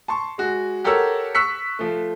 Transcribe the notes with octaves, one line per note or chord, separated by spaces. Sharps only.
A5 C6 C#6
G#3 F#4
G4 A4 A#4 C#5 F#5 E6
C#6 E6 F#6 B6 C#7
F3 A3